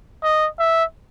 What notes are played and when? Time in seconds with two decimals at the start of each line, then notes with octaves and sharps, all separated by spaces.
0.23 D#5
0.59 E5